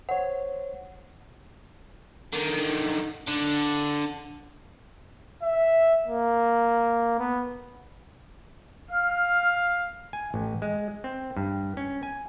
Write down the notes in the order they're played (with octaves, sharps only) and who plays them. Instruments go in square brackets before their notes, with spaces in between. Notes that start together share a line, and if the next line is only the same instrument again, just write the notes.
[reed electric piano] C5 C#5 [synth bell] F#5
[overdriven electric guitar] D3 D#3
D3 D4
[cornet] E5
A#3
B3
[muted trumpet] F5 [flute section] F6
[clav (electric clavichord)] G#5
A1
G#3
C4
G2
C#4
G#5